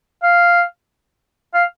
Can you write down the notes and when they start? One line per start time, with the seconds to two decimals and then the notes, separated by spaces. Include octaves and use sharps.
0.23 F5
1.54 F5